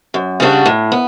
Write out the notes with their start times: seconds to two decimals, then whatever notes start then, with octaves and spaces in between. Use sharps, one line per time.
0.14 F#2
0.40 C#3 G3 D4 F#4
0.66 A2
0.92 B3